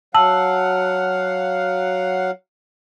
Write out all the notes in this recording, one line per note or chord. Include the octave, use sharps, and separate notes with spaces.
F#3 F5 F#5 A5 E6 F#7